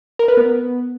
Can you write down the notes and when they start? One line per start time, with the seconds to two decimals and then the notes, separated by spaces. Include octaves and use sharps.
0.19 A#4
0.28 B4
0.37 B3